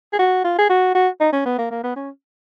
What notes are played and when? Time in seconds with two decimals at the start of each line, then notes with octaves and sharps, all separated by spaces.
0.13 G#4
0.19 F#4
0.44 F4
0.58 G#4
0.70 F#4
0.95 F#4
1.20 D#4
1.33 C#4
1.46 B3
1.58 A#3
1.71 A#3
1.83 B3
1.96 C#4